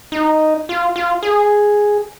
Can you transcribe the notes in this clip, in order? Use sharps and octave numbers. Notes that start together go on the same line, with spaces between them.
D#4
F4
F4
G#4